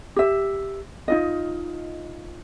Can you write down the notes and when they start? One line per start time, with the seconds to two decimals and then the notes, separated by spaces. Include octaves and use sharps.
0.16 G4 E5
1.08 D#4 F4 D#5